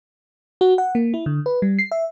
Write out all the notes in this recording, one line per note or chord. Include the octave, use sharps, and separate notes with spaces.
F#4
F#5
A#3
E4
D3
B4
G3
C7
E5